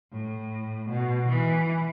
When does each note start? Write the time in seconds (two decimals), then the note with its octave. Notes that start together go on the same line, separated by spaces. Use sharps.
0.12 A2
0.90 B2
1.29 E3